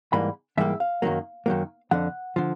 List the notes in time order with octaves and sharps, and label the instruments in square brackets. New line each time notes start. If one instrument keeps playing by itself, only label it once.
[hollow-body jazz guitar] G#2 E3 G3 A#3 B5
G#2 E3 G3 A#3 E5
F5
F#2 D#3 F#3 A#3
F#2 D#3 F#3 A#3
F2 D3 F3 F#5
D3 F3